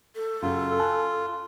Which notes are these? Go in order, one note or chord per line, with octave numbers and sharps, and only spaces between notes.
A4
F#2 C#3 F4
G#5 A5 F#6